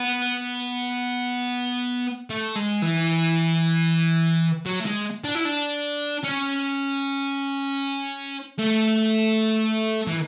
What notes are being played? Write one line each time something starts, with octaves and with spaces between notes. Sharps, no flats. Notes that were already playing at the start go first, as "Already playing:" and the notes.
Already playing: B3
A3
G#3
E3
F#3
A3
G#3
D4
E4
D4
C#4
A3
E3